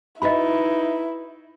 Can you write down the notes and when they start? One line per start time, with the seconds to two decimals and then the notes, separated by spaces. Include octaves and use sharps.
0.22 D#4 E4 F#4 B4 D#5 E5 B5